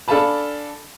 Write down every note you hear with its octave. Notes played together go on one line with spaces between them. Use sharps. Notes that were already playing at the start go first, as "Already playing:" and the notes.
D4 A4 F5 G#5 A5 B5